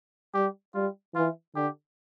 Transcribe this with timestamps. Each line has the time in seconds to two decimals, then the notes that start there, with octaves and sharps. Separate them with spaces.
0.34 G3 G4
0.74 G3 F4
1.15 E3 F4
1.55 D3 G4